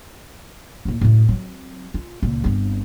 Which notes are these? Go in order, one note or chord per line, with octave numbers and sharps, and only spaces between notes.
D#2 A2
F#2 A2
F#3 C4
F4
C#2 A#2
G1 C4